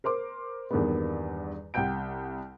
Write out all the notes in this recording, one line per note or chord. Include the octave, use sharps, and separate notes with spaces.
A#4 C5 C6 D6
E2 G2 D#3 G3 A#3 B3
C2 F#5 G5 G6 D7